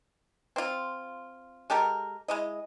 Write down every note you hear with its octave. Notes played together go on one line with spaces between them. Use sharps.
C4 F4
G#3 G4 A4 A#4
G#3 E4 D#5